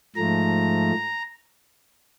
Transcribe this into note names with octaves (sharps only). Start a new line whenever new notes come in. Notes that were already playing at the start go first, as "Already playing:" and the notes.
G#2 F3 A3 A#5